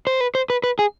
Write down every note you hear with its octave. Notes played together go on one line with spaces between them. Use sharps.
C5
B4
C5
B4
B4
G#4